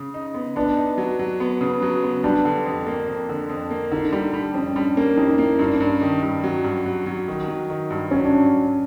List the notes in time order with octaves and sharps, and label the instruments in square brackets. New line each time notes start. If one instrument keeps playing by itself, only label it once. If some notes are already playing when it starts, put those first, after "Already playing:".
Already playing: [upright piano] C#3
D#4
B3
[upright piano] B3 [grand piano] D4
[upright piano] D#4
F#3
F#3
B3
C#3
F#3
B3
[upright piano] G3 [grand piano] D4
[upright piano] D3
F2
A#3
F2
D3
F2
A#3
[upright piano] D3 [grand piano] D#4
[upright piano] G3 [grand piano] D#4
[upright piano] G3 [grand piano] D4
[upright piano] F2 [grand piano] C#4
[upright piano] G3 [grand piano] D4
[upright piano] A#3 [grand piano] C#4
[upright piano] F2 [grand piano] D#4
[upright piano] A#3 [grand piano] E4
[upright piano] G2 [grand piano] D#4
[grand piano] D4
C#4
[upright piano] G2 [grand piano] D4
[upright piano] D#3
G2
F#3
G2
F#3
F#3
D#3
F#3
D#3
G2
[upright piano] F#3 [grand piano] C#4
[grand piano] D4